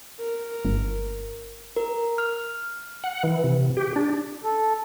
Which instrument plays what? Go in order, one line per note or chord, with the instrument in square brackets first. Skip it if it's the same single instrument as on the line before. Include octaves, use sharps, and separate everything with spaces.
[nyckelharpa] A#4
[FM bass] G1
[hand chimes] A#4
F6
[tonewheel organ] F#5
E3
C3
G4
D4
[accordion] A4